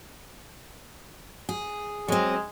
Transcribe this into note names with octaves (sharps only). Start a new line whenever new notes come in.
G#4
F#3 G#3 C4